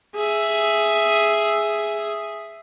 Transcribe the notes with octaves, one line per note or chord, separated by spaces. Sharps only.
G#4 E5